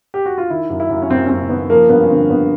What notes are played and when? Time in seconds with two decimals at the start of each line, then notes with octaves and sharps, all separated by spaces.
0.14 G4
0.26 F#4
0.38 F4
0.50 D#3 E4
0.70 F#2
0.80 E4
0.90 F#2
1.02 C#4
1.10 F#2 C4
1.26 C#4
1.29 F#2 C4
1.49 D#3 B3
1.70 F3 A#3
1.89 G2 B3
2.03 C#4
2.10 D3 C4
2.30 G2 B3